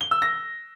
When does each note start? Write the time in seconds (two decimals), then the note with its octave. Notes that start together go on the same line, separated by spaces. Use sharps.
0.01 G7
0.11 E6
0.22 A#6